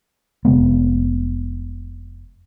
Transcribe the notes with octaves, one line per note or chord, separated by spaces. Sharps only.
F1 C3 G#3 B3